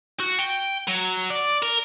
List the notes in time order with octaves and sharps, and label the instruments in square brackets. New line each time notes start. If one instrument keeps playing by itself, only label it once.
[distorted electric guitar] F#4
G5
F#3
D5
A#4